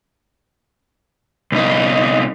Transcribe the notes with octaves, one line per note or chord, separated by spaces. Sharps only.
C2 D#4